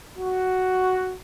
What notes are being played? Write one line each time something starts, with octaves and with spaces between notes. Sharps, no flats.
F#4